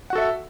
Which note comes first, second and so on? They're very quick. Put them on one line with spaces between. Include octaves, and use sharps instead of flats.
F#5 F#4 A4 E5